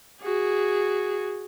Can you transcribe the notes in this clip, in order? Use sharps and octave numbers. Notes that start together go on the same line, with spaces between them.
F#4 G#4